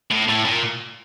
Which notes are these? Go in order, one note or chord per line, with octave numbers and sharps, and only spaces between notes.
A2
A2
A#2